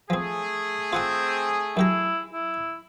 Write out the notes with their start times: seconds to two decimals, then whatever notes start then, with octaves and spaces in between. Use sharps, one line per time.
0.10 F3 A3 C4 G#4
0.93 C4 F4 F#5 G#5
1.77 F#2 E4 G4 A#5
2.33 E4